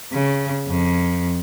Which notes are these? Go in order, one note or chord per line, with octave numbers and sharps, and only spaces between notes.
C#3
F2